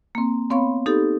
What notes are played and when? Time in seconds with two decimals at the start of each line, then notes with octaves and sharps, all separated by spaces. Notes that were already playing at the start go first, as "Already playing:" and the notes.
0.15 A#3 C4
0.50 B3 C4 C#5 F5 B5 C#6
0.86 D#4 G4 A4